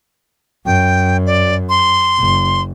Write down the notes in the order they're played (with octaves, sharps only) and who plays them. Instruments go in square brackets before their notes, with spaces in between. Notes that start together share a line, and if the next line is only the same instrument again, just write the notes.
[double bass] F#2 [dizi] G5
[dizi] D5
C6
[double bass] F#1